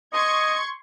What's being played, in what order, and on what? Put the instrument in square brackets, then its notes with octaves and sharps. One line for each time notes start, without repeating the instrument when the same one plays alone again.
[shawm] D#5 [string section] C6 C#6 G#6